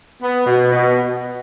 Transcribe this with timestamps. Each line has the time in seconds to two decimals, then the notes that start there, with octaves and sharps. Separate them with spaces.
0.22 B3
0.47 B2
0.73 B2